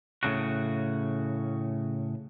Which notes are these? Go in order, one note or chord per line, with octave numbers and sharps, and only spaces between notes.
A2 C#3 F#4